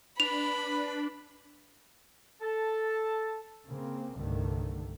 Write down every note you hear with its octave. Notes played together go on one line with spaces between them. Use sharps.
D4 B4 B5 F7
A4 A5
C#3 A#3 C4
C2 G2 D3 D#3 A3